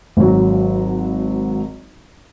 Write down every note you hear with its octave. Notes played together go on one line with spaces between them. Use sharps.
G#1 F#3